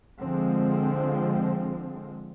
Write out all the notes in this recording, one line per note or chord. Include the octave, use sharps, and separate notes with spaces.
D3 F3 G#3 C4